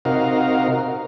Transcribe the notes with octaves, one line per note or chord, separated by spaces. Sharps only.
C3 D#4 F#4 A#4 F5